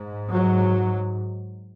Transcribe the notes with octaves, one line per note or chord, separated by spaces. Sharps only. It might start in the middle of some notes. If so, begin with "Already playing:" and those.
Already playing: G#2
F#3